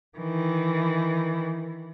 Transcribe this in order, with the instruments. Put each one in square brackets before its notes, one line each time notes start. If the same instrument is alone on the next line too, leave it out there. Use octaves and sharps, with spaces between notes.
[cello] D#3 E3